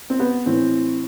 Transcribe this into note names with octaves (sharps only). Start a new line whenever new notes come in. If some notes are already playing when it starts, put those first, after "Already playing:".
C4
B3
A2 E3 C4